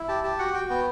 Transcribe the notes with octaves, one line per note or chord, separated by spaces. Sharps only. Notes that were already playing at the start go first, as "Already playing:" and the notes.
Already playing: E4
G4 A5
G4 A5
F#4 F#5
F#4 G5
B3 G5